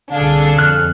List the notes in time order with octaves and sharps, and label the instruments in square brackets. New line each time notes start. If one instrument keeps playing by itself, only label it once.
[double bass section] C2 D3 [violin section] D4 G#4 A4 [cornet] F5
[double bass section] F2 [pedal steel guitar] F6 F#6